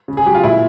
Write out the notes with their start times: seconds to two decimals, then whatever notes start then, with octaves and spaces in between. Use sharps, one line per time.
0.08 C#3
0.17 G#4
0.26 F#3 G4
0.35 F4
0.44 A#2 E4